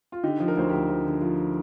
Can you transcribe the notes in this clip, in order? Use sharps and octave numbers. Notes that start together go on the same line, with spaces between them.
F4
D3 D#4 G4
F3
A#4
D2 C5
D2 G4 A#4
F3
D3
F3